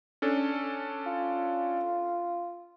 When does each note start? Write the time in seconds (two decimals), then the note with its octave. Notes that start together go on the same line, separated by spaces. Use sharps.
0.22 C#4 D4 A4
1.06 F4